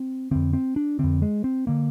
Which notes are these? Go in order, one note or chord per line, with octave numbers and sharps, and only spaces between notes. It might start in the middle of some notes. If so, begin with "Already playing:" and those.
Already playing: C4
F2 D3 C4
C4
D4
F2 D3 C4
G#3
C4
D3 A#3